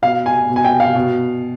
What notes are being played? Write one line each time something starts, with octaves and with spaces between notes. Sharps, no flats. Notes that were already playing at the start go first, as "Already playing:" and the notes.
B2 F5
G#5
B2
G#5
G5
F5
B2